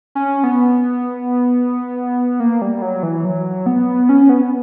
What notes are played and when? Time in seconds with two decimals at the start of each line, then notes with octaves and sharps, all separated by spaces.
0.15 C#4
0.44 B3
2.40 A#3
2.62 G3
2.82 F#3
3.03 E3
3.25 F#3
3.66 B3
4.09 C#4
4.29 B3